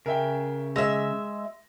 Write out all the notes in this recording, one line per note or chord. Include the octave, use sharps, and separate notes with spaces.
C#3 A#4 E5 G5
G#3 E5 E6 A#6